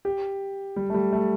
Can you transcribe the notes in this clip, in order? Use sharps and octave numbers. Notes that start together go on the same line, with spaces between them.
G4
G3
A3
G3
A3